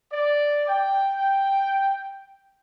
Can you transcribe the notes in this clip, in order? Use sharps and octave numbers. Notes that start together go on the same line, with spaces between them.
D5
G5